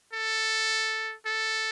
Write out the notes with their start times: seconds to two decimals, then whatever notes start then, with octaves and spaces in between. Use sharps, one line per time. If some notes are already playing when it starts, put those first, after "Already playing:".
0.13 A4
1.25 A4